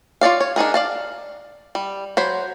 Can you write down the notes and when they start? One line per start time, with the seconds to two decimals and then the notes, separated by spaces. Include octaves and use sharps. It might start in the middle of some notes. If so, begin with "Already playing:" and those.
0.21 F4 C#5 D5 F5
0.40 C#5
0.56 D4 D#4 G#4 A#4
0.74 D5 F5 A5
1.75 G3
2.17 F#3 C5 B5